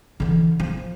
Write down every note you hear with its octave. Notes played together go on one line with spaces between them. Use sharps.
D3 E3
F3